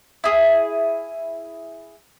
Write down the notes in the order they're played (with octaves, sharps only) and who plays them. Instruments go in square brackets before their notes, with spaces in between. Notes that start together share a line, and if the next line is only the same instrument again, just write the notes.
[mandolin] E4 G#4